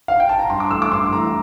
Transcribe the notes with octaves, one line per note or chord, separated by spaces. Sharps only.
F5
G5
A5
A#5
G2 C6
D6
E3 A3 E6
D6
G2 C6
E3 A3 A#5